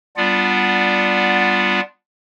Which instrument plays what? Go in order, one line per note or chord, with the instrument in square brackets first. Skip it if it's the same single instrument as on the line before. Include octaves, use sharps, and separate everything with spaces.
[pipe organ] G3 B3 D4 F4 D5 F#5